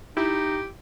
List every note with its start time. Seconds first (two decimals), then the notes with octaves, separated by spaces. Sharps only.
0.17 D#4 E4 G4